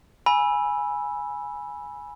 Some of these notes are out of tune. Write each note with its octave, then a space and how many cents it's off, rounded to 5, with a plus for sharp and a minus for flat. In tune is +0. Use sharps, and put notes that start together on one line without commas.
G#5 +0 B5 -20 E6 +5